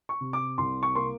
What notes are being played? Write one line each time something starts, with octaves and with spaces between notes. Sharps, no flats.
C#6
C3
D6
C2 C6
C#6
A#3 C6